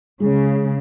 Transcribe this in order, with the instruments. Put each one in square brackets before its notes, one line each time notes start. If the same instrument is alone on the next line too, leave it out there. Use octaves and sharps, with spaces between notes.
[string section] C#3 [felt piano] G#3